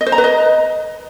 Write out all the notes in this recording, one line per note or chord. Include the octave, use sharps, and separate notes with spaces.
D#5
C5
A#5
B4
D#5